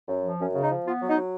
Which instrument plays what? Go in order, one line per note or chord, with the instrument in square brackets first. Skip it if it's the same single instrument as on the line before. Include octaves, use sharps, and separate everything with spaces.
[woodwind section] F#2
F3
F#2 C#4
C#3
D#4
F3
B3 F4
F#3
D#4
F#3